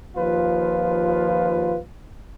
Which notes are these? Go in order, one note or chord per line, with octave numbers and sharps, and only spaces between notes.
D#2 F3 F4 B4